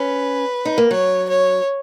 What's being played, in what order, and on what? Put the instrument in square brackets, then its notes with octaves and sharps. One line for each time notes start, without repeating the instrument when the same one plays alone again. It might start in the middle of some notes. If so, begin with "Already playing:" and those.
Already playing: [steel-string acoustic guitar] C#4 [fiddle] B4
[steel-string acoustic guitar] D#4
A#3
[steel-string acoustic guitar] F#3 [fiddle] C#5
[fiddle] C#5